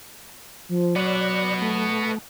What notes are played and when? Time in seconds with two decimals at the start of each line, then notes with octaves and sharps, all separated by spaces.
0.69 F3
0.96 F#3 B3 F#4 D5 F#6
1.62 A3